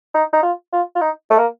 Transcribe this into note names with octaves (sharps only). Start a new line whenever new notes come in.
D#4
D#4
F4
F4
F4
D#4
A3
A#3